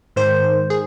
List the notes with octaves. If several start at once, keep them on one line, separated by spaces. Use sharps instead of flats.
G#2 D#3 C5
G#4